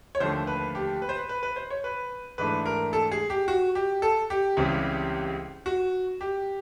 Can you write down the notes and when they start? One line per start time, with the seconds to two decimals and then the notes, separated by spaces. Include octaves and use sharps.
0.15 C#5
0.20 D#2 D3 F3 A3 C5
0.47 B4
0.75 G4
1.02 B4
1.09 C5
1.17 B4
1.29 B4
1.43 B4
1.56 C5
1.70 C#5
1.84 B4
2.38 G#2 E3 A3 D4 B4
2.66 A#4
2.93 A4
3.12 G#4
3.30 G4
3.48 F#4
3.75 G4
4.02 A4
4.30 G4
4.57 C#2 C#3 E3 G3 C4
5.66 F#4
6.21 G4